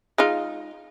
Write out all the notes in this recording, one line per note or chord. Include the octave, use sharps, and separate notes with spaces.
G#3 D#4 F4